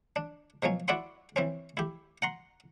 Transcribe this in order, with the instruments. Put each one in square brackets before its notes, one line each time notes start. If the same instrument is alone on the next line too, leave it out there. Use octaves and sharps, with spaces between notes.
[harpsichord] D4
B2 F3 F#3 C#4
E4 F#4 D5 E5 F#5 C6
E3 C4 C#4
E4 G4
F#5 A#5 C6